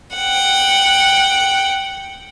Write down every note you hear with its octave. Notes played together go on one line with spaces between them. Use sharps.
F#5 G5